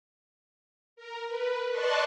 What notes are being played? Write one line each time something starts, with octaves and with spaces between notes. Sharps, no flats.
A#4
B4
D5 D#5 A5 C6 C#6 F#6